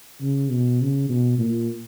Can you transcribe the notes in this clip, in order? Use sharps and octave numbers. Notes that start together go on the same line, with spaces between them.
C#3
B2
C#3
B2
A#2